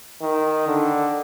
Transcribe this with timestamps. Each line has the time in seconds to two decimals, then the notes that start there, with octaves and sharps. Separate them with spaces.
0.22 D#3
0.68 D3